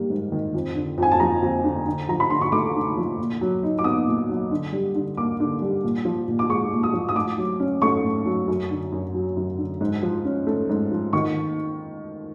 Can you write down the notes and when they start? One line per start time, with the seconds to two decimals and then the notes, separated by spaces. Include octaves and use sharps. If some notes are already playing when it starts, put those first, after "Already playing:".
Already playing: D#3 G3 A#3
0.10 G#2
0.32 D#3
0.54 F2
0.76 D3
0.98 F2 G#5
1.12 A5
1.20 F3 A#5
1.42 F2
1.64 D3
1.86 D3
2.09 F3 A#5
2.20 B5
2.30 D3 C6
2.41 C#6
2.52 A3 D6
2.75 D3
2.97 F3
3.18 A#2
3.41 F#3
3.63 D#4
3.79 D6
3.84 B3 D#6
4.07 A#2
4.29 F#3
4.51 D3
4.73 G3
4.95 D3
5.17 A#3 D6
5.40 D3
5.62 G3
5.84 A#2
6.05 F3
6.28 A#2
6.39 D6
6.49 G#3 C#6
6.72 A#2
6.83 D#6
6.93 F3
7.09 D#6
7.16 A2 D6
7.38 F#3
7.60 C#4
7.82 A3 C#6
8.04 A2
8.26 F#3
8.48 F#2
8.71 D3
8.92 F#2
9.15 F#3
9.37 F#2
9.58 D3
9.81 G#2
10.03 F3
10.25 C#4
10.47 A3
10.69 G#2
10.91 F3
11.13 D#3 C#6